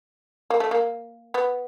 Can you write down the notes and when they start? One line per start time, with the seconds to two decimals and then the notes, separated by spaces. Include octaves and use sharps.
0.50 A#3
0.60 A3
0.71 A#3
1.34 B3